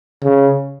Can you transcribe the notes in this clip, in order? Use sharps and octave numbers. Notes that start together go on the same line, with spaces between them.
C#3